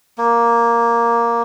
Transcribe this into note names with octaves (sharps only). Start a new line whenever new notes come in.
A#3